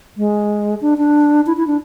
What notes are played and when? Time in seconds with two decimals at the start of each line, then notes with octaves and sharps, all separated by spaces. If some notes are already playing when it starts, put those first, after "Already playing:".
0.17 G#3
0.81 D4
0.98 D4
1.46 E4
1.57 E4
1.67 D4